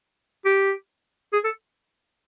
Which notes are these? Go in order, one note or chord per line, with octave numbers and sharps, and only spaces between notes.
G4
G#4
A4